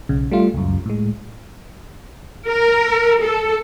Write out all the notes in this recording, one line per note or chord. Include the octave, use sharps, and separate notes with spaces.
B1 C#3
G3 A3 F4
C#2 F#2
A2 G#3
A#4
A4